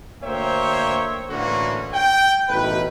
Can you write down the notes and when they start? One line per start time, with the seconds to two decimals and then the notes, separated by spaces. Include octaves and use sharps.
0.23 D2 A#3 C5 C#5 E5 G5
1.30 A2 D3 E3 A#3 C#4 F#4
1.93 G5
2.49 A1 B2 D#3 B4